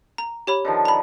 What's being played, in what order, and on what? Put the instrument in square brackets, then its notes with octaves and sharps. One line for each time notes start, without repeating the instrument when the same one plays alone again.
[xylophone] A#5
G4 C#5 B5
[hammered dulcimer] D3 D#3 F3
[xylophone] A#5 B5